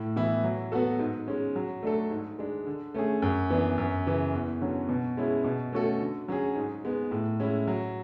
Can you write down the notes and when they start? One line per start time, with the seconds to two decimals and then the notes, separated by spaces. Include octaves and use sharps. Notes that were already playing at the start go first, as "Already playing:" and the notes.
Already playing: A2
0.16 E3 B3 E4
0.44 F#3
0.72 B3 F#4 A4
0.99 G#2
1.28 G#3 C#4
1.56 F#3
1.83 A3 D4 A4
2.11 G#2
2.39 G#3 D4
2.66 D3
2.94 A3 C#4 G#4
3.22 F#2
3.50 E3 B3 D4
3.78 F#2
4.06 C#3 E3
4.33 E2
4.61 D3 F#3 C#4
4.89 B2
5.17 G#3 C#4 E4 G#4
5.44 B2
5.73 A3 C#4 F#4 A4
6.00 D3
6.28 F#3 C#4 G#4
6.56 G#2
6.85 G#3 B3
7.11 A2
7.40 G#3 C#4 E4
7.68 F#3